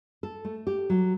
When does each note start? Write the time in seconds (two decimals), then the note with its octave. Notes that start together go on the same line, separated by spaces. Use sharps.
0.23 A4
0.45 A3
0.67 G4
0.90 F#3